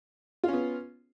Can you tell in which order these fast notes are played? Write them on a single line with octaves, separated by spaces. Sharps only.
F4 C#4 B3